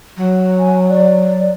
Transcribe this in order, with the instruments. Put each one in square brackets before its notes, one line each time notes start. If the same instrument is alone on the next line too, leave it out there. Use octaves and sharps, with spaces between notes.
[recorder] F#3
[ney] G#5
D5